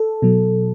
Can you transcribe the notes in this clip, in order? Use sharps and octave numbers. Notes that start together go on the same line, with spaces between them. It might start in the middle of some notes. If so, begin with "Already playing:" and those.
Already playing: A4
B2 F#3